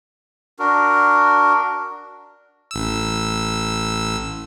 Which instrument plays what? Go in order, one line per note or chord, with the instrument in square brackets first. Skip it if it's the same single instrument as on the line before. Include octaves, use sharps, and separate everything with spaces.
[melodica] D4 F#4 A#4
[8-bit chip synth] A1 E6